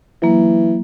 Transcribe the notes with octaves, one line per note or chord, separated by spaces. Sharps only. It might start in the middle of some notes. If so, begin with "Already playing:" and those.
E3 F#3 A#3